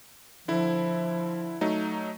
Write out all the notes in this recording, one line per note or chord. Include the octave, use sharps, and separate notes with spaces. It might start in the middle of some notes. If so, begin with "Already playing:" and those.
D3 F3 E4
F#3 A3 D#4